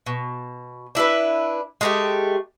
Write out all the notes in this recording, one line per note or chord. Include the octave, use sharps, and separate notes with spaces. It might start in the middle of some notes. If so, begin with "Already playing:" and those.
B2
D4 E4 G#4 B4
G#3 A3 G4